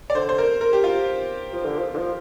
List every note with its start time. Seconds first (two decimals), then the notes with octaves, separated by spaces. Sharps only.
0.10 D5
0.15 D3 C5
0.29 C5
0.38 A#4
0.61 A#4
0.73 G4
0.84 F4
1.53 F3
1.65 D3
1.78 F3
1.94 D3
1.98 F3